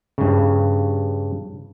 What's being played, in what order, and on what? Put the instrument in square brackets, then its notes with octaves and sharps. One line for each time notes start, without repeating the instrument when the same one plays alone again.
[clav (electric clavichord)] G2 C#3